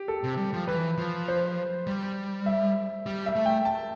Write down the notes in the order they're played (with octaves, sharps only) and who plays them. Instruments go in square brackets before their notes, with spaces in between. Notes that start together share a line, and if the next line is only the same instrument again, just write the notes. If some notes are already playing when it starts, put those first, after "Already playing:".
Already playing: [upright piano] G4
A4
[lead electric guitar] C3
G3
F3
[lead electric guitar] E3 [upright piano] B4
[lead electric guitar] F3
[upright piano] C5
[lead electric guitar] G3
[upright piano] E5
[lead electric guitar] G3
[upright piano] E5
[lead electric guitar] A3
[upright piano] G5
A5